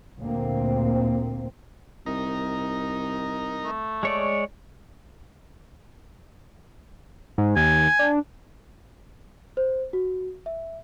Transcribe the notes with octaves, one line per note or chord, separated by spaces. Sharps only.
D2 A#2 A#3 C4
C2 D#4 A#4
A3
G#3 C#5 D5
G#2
D#2 G#5
D4
C5
F#4
E5